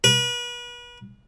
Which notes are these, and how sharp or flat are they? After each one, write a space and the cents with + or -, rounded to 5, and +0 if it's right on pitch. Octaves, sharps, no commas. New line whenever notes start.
B4 -35